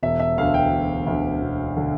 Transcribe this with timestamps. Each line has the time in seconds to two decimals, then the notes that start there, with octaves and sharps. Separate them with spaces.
0.03 E1 E5
0.20 E5
0.37 D2 D3 F5
0.54 G5
0.72 E1
1.06 D2 D3
1.41 E1
1.77 D3